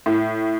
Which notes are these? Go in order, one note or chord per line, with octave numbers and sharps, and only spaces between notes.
A2